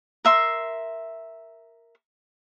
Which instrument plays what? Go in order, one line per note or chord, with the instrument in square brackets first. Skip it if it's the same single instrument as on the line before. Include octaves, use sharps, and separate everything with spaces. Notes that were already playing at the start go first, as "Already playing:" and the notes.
[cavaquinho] A#4 E5 C6